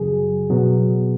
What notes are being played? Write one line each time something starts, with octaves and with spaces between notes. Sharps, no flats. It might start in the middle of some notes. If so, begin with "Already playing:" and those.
Already playing: F#2 C#3 F#3 G#4
B2 F#3 B3